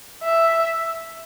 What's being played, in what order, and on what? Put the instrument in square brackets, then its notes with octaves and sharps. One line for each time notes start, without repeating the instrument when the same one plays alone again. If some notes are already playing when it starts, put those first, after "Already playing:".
[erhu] E5